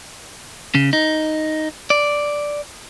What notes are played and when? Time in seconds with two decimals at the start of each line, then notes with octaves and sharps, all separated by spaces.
0.75 C#3
0.93 D#4
1.90 D5